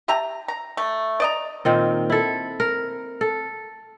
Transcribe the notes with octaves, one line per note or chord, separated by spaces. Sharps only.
G4 E5 A5 A#5
A#5
A3
D5 D#5 A#5
A#2 D#3 C4
E4 A4
A#4
A4